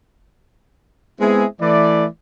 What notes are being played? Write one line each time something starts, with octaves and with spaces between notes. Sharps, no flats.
G#3 B3 C4 E4 G#4 E5
E3 A3 D5